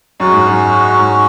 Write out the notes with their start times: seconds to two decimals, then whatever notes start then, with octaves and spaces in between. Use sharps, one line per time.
0.20 F#2 G#3 C#4 F#4 C#5
0.33 G#2
0.46 F#2
0.99 G#2